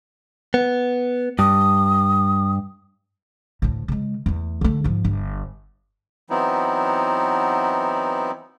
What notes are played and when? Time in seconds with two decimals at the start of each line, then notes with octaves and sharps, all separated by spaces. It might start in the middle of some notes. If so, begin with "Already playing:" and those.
0.54 B3
1.39 G2 D#6
3.62 D2 A2
3.88 C#3 G#3
4.26 E2 A3
4.61 D3 A3
4.84 G#2 F3
5.05 G1
6.30 E3 F#3 B3 C4 D#4 E4